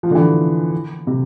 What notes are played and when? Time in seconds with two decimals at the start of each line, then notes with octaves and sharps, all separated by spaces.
0.03 F3
0.11 D3
0.15 E3
1.07 C3